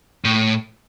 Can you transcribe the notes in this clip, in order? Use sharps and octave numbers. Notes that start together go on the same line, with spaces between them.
A2